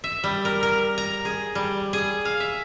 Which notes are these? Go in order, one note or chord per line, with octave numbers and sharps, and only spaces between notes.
E5
G3
A#4
A#4
A#5
G#4
G3
G#4
F5
E5